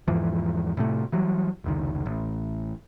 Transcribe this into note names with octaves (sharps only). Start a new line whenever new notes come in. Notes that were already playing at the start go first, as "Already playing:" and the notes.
E2 G#2 E3 F3
A2 C3 A3
E3 F#3 G3
F1 C#2 D#3
A1